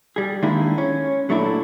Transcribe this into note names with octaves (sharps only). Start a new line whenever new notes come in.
G3 G#4
D#3 G#3 A#3 D4 E4
C#4
A#2 F#3 A3 D4 E4